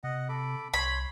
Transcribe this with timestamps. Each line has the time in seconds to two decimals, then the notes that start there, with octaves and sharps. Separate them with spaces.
0.04 C3 D#5 F#5
0.29 A4 B5 D6
0.74 C2 C#5 B5 C6